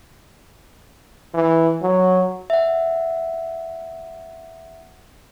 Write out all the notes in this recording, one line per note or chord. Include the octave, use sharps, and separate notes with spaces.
E3
F#3
E5 F#5